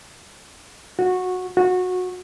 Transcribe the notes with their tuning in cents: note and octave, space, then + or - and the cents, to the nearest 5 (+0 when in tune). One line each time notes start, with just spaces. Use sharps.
F#4 -15
F#4 -20